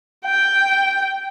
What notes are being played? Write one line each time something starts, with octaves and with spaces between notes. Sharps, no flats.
G5